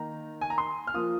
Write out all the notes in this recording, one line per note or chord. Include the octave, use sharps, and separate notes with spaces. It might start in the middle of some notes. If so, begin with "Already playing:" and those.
Already playing: D#3 A#3 D#4 A#5
G#5
A#5
C6
F6
F3 A#3 F4 D#6